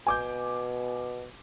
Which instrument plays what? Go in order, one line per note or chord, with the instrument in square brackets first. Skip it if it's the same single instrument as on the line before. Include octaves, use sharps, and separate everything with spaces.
[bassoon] B2 [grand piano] G#5 D6 G6